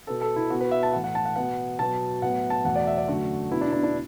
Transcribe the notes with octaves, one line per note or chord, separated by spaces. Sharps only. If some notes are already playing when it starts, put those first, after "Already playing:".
B2 B3 A4
A4
E4
B2 B3 F#4
B4
E5
A5
A2 E3 A3 F#5
F#5
A5
F#5
B2 B3 F#5
B2 F#3 B3 A5
A2 F#3 B3 F#5
A5
E2 B2 A3 F#5
D5
E5
D5
F#2 D3 A3 F#4
B2 B3 E4
D4
D4
D4